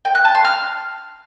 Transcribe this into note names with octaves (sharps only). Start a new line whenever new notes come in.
G5
F#6
A5
C6
F6